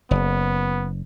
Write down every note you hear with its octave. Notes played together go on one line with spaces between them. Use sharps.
F#1 B3